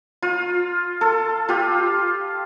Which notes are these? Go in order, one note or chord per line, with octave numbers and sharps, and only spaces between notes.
F4
A4
F4 G4